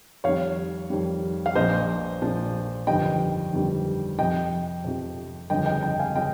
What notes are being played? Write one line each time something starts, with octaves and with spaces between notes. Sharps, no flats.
F2 D#3 G3 C#5 F5
F2 D#3 G3
F5
A#1 A#2 F3 C5 D#5
A#1 A#2 F3
G1 F2 D#3 G3 D#5 G5
G1 F2 D#3 G3
F2 C3 F3 D#5 G5
F2 C3 F3
G1 F2 C#3 F3 D#5 G5
D#5 G5
D#5 G5
F5 G#5
C#3 F3 D#5 G5